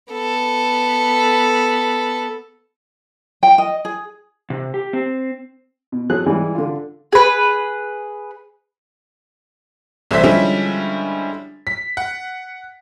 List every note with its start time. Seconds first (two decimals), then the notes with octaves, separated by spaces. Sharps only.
0.13 B3 A4
3.43 G5
3.58 D#5
3.85 G#4
4.50 C3
4.74 G4
4.93 C4
5.92 B2
6.10 F#3 G#4 A4 F#6
6.26 E3 G3 G#3
6.55 D3 F4
7.13 G#4 B4
10.11 C2 E3 A3 C5 E5 B6
10.23 D3 F3 G3 G#3 C#4 E4
11.67 B6
11.97 F#5